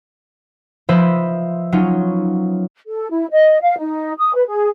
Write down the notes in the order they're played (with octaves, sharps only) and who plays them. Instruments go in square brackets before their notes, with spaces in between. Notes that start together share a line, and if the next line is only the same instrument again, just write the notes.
[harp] F3 B4 C5 D#5 E5
F#3 C#4 D#4 F4
[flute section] A4
E4
D#5
F5
D#4
D#6
B4
G#4